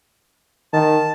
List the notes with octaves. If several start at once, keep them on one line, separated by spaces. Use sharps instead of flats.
D#3 A5